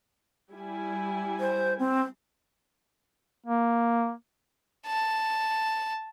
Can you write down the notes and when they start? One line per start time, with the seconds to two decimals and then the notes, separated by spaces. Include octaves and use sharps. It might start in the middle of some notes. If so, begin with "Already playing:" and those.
0.51 G3 E4 G#5
1.40 C5
1.79 C4
3.46 A#3
4.87 A5